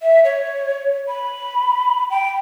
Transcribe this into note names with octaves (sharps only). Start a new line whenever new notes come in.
E5
C#5
B5
G5